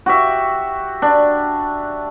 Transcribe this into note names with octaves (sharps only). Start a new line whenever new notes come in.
F#4 G4 E5
D4